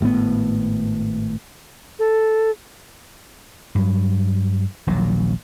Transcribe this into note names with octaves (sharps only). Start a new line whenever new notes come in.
G#1 A2 D3 B3
A4
G2 F#3
D#1 A#1 A#2 F#3